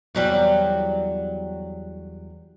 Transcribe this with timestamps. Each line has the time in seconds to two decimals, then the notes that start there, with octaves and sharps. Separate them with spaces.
0.15 E2 F#3 G3